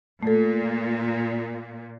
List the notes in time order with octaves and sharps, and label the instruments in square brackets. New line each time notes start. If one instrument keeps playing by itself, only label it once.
[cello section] A#2 [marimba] A3 A4